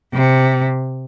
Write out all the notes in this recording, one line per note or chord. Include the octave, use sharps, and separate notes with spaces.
C3